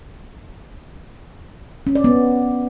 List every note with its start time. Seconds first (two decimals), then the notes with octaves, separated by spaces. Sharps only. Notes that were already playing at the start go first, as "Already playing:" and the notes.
1.87 C#4
1.95 D5
2.04 B3